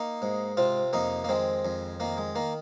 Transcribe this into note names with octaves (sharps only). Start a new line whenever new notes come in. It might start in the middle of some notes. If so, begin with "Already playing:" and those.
Already playing: A#3 D#4
G#2
C3 C4 F4
F2 A#3 D#4
A#3
D#3 G#3 C4
F2
D#3 A#3
G#3
D#3 A#3